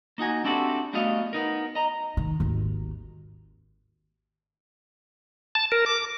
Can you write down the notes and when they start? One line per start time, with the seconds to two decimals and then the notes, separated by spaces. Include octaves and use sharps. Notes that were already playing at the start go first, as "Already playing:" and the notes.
0.18 A#3 D#4 F#4 G#5
0.45 C4 D4 E4 F#4 G4 A4
0.93 G3 A3 B3 F#4 D#5 F5
1.33 B3 D#4 A#4
1.75 D#5 A#5
2.17 D#3
2.40 G#1 D#2
5.55 A5
5.72 A#4
5.86 D6